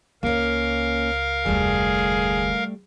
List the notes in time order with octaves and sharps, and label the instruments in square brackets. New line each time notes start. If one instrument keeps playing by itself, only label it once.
[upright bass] C#2 [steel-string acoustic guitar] A#3 C#4 [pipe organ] A#4 F5
[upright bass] F1 D2 [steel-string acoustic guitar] G3 A3 [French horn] G#4